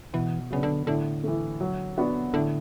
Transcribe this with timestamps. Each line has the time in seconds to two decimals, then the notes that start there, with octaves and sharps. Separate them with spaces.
0.13 B2 E3
0.51 C#3 F#3 B3 D4
0.63 D3
0.87 A2 D3
1.24 E3 A3
1.61 F#3
1.98 B3 D4 F#4
2.34 A2 D3